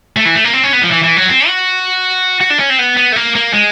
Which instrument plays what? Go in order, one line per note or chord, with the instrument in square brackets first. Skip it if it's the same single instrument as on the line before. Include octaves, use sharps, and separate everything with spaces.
[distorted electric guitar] A3
E3
A3
A#3
C4
C#4
B3
F3
E3
E3
F#3
C4
F#4
F#4
D4
C#4
C4
B3
B3
A3
A#3
A#3
G#3